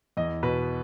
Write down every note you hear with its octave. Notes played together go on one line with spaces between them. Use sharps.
E2 D#5
B2 B4